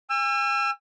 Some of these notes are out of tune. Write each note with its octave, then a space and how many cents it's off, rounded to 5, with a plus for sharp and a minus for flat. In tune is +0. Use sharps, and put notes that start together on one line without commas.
G#5 -35 E6 +35